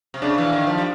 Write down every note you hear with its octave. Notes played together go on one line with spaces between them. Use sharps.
C3
C#3 D4
E3
D#3
F3
G3